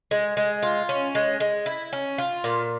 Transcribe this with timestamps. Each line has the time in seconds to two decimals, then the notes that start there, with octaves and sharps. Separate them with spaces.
0.11 G#3
0.37 G#3
0.63 F4
0.89 C#4
1.15 G#3
1.40 G#3
1.66 E4
1.93 C#4
2.18 F4
2.44 A#2